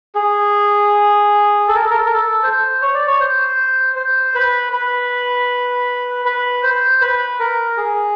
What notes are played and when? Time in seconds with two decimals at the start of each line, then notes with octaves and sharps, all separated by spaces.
0.15 G#4
1.68 A4
1.75 A#4
1.82 A4
1.90 A#4
1.98 A4
2.06 A#4
2.14 A4
2.43 C5
2.82 C#5
2.94 D5
3.07 C#5
3.20 C5
3.96 C5
4.35 B4
4.73 B4
6.25 B4
6.63 C5
7.01 B4
7.40 A#4
7.77 G#4